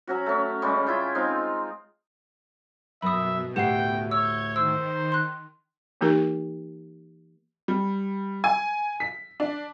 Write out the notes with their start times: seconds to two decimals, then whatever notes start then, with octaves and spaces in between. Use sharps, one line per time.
0.07 F#3 C#4 F#4
0.26 A3 C#4
0.62 C#3 G3 G#3 C#4
0.87 E4 F4 G5
1.15 G#3 C4 D#4 F4
3.02 F#2 B2 E5 B5 D#6
3.56 D2 A2 G4 F#5 G5 C7
4.11 C#5 E6 G6 G#6
4.56 D#3 C5 E6
5.12 C6 F#6
6.01 E3 A#3 D#4 G4 A#4
7.68 G3
8.44 G#5
9.00 B6
9.40 D4